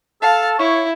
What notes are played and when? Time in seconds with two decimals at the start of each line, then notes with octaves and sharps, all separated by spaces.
0.22 A4 F5 A5
0.59 E4 C#5